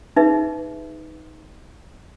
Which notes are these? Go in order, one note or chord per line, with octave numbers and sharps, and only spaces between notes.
D#4 G#4 B4 E5